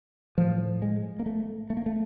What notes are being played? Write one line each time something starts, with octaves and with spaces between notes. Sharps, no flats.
A2 F3
G#3
A#3
A3
A3
A#3
A3